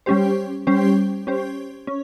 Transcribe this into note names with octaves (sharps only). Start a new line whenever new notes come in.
G3 C#4 G4 C5
G3 C#4 G4 C5
C#4 G4 C5
C#4